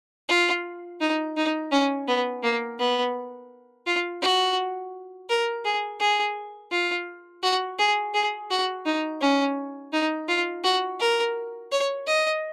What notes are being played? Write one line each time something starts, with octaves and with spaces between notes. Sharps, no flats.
F4
D#4
D#4
C#4
B3
A#3
B3
F4
F#4
A#4
G#4
G#4
F4
F#4
G#4
G#4
F#4
D#4
C#4
D#4
F4
F#4
A#4
C#5
D#5